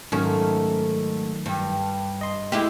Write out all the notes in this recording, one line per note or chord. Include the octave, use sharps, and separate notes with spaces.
G#2 D#3 F#3 A3 C#4
G2
D#5 C6
G#3 A3 E4 G4